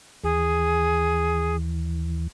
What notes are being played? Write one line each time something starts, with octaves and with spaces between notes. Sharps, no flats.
D#2 E3 G#4